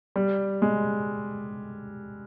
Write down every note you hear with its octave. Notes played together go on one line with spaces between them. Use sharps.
G3
G#3